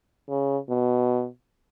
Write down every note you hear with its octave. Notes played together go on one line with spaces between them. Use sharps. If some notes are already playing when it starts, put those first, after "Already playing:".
C#3
B2